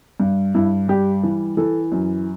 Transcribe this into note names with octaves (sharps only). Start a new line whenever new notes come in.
G2
G2 E4
G3 G4
E3
E3 A4
F#2